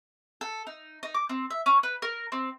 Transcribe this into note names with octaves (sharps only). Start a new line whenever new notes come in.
A4
D#4
D#4
D6
C4
E5
C#4
B4
A#4
C4